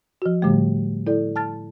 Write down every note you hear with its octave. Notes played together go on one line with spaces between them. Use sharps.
F3 F#4
A2 D3 F3 G3 A3
E4 A4 D5
A5 F6 A6